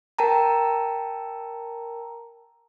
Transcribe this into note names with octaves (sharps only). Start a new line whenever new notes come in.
A#4 G5 A5 A#5